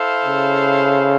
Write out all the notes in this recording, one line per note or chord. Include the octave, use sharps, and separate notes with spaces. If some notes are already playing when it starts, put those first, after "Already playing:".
Already playing: E4 A4 C5 F5
C#3